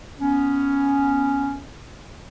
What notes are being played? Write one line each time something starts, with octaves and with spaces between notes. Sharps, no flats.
B3 C#4